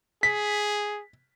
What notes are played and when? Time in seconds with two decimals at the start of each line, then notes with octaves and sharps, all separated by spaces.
0.23 G#4 B6